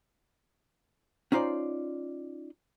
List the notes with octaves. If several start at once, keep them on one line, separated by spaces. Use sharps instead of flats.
C#4 D#4 F4 C5 D5